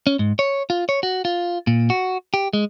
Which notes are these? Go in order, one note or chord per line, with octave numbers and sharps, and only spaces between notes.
C#4
G#2
C#5
F4
C#5
F#4
F4
A#2
F#4
G4
G#3